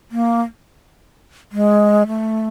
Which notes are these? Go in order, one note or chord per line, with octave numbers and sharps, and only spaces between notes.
A#3
G#3
A3